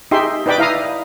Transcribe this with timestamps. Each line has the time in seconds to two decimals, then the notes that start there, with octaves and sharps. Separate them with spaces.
0.11 D#4 G4 G#4 E5 G5 C6
0.46 D#4 B4 D5 G5 B5 D6
0.58 E4 F5 A#5 D#6